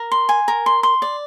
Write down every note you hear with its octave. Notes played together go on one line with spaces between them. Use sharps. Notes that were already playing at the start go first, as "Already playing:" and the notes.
Already playing: A#4
C6
G#5
A#4
C6
C6
D5